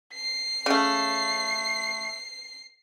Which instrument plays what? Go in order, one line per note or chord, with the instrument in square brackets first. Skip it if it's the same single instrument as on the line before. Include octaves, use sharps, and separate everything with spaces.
[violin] C7
[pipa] C#3 A3